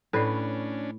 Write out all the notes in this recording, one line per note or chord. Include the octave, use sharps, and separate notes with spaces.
A2 C#4 D4 A4 B4 D5